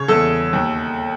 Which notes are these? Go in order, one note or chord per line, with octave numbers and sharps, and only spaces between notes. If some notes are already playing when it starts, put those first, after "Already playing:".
Already playing: C#3 C#5
E2 A4
D#2